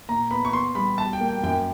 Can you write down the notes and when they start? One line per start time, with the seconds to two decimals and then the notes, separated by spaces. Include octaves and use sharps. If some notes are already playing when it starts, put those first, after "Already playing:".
0.09 A#2 A#5
0.31 B3 B5
0.45 C#6
0.53 B3 C6
0.75 G3 B5
0.98 B2 A5
1.13 G5
1.20 A#3
1.28 G5
1.43 F#2 G5